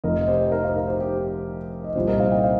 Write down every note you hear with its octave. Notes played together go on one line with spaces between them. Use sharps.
F1 F2 F3 A#4 D#5
D#5
G4 C5
A#4 D#5
C5 F5
A#4 D#5
G4 C5
G4 C5
D#5
C2 A#2 F3 G4 C5
A#4 D#5
C5 F5
D#5 G5
C5 F5